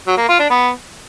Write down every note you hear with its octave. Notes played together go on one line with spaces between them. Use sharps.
F#3
A#3
F4
D4
B3